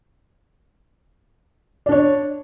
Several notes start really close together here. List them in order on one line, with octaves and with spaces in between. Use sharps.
D5 D4 C#5